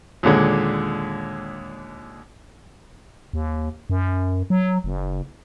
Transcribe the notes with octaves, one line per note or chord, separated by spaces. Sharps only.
D#2 A#2 D3 G#3
D#2
F#2
F#3
F#1